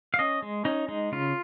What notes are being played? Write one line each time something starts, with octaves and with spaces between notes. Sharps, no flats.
F5
C#4 D#5
G#3
C#4 D#4
G#3 D#4
C#3 F4